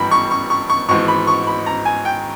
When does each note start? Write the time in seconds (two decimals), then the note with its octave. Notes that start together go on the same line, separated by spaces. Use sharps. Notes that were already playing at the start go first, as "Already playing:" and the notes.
Already playing: G#1 G2 E3 A#5 B5
0.11 C#6
0.31 C#6
0.50 C#6
0.70 C#6
0.89 G#1 G#2 E3 C#6
1.08 B5
1.27 C#6
1.47 B5
1.66 A#5
1.85 G#5
2.05 G5